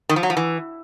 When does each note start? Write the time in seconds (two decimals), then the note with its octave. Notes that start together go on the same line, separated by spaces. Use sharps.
0.09 D#3
0.16 F3
0.23 F#3
0.30 F3
0.37 E3